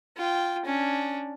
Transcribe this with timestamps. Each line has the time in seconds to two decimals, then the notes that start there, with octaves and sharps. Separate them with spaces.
0.17 F4 G5
0.66 C#4 D4